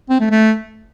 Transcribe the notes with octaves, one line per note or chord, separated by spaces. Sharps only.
C4
A3
A3